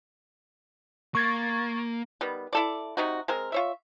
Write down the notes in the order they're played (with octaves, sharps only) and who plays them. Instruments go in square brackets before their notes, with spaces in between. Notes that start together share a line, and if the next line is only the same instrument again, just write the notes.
[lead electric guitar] A#3 [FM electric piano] C#6 G#6 A6
[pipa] D#3 G3 B3
E4 A4 D5
C3 D#4 F#4
G#3 C4 A#4
F4 C#5 E5